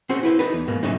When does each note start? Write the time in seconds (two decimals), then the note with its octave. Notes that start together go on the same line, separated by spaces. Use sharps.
0.09 C4 C#4 F#4 G#4 C5
0.23 E4 B4 C5
0.39 D#4 A4 B4
0.53 E2
0.67 G#2 B2 A#3
0.83 F#2 A#2 C#3 A3 D#4